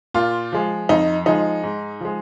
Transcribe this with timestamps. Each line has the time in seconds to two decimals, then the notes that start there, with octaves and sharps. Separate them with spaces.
0.14 A#2 F4
0.52 F3 G#3
0.89 F2 D#4
1.26 F3 G#3 D#4
1.63 G#2
2.01 F3 G#3